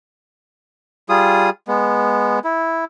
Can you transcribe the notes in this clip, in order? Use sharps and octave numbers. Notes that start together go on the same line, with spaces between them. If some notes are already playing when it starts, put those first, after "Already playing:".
G3 F4 G#4 D#6
G#3 B3
E4